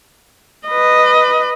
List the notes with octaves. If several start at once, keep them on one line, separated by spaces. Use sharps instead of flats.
B4 D#5